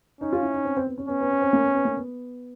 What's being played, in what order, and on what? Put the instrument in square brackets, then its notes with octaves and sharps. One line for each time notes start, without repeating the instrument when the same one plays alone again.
[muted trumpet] C#4 [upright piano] D#4
[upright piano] F4
E4
D#4
C4
C4
B3
C#4
[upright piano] B3 [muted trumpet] C#4
[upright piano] B3
B3
C4
A#3
B3
B3
A#3
B3